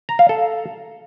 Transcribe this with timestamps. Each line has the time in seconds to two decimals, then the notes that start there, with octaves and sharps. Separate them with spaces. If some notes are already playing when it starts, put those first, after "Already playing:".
0.09 A#5
0.19 F5
0.29 A4